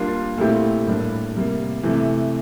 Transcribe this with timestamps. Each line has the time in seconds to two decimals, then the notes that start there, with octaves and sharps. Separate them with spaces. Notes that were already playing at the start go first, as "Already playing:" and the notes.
Already playing: G3 A#3 D4 F4
0.38 A#2 A3 C4 E4 G4
0.87 A2 G3 A#3 D4
1.34 C3 G3 A#3
1.83 C3 E3 A3